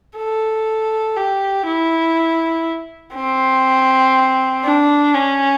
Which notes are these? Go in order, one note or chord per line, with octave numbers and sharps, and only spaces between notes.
A4
G4
E4
C4
D4
C#4